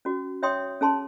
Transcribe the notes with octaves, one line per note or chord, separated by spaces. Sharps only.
C#4 F#4
C#5 E5 G5 C6 D#6
C#4 G#4 A5 C6